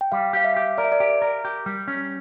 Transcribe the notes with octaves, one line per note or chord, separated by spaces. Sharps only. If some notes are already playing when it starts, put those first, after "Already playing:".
G5
G3 F5
G4 F5
E5
G4
A#4 D5
E5
D5
G4
A#4
G4
G3
C#4